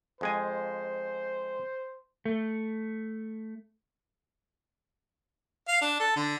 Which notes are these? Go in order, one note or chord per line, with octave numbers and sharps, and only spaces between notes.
F2 G#3 C5 G#5
A3
F5
D4
A4
D3